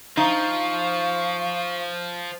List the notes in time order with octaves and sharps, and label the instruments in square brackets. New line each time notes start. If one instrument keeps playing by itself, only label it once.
[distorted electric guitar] F3 [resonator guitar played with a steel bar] D#4 [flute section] F5 C#6